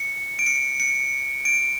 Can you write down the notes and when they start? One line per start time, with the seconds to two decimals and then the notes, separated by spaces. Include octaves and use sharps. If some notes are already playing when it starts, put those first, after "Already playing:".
Already playing: C#7
0.39 D7
0.46 C#7
0.80 C#7
1.45 D7